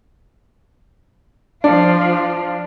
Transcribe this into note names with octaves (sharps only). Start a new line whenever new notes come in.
F3 D4 F4